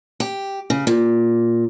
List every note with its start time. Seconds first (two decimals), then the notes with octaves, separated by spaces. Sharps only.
0.20 G4
0.70 C#3
0.87 A#2